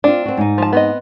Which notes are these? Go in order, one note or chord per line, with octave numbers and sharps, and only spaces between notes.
C4 D4 F4
C4 F#4
G#2 D#4
F3 A5
B3 C4 D#5